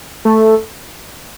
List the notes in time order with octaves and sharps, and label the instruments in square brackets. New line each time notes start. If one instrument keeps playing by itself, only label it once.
[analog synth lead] A3